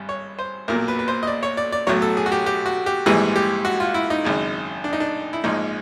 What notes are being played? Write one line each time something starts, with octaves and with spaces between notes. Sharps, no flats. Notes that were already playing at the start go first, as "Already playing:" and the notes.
Already playing: G#1 G2
C#5
C5
B1 A#2 F#3 A#4
B4
B4
C5
D#5
D5
C#5
D5
D5
B1 A2 F#3 C#5
A4
G#4
F#4
G4
G4
F#4
G4
A#1 G#2 E3 G3 G#4
G4
F#4
F4
E4
D#4
G#1 F#2 C#3
D4
D#4
D4
E4
A#1 G#2 F3 G#3 D#4